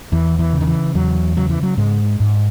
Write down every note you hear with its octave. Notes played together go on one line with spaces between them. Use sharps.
E2 E3
E3
C#3
D#3
E3
E2 F#3
C#3 F#3
E3
F#3
G#2 G#3
G#2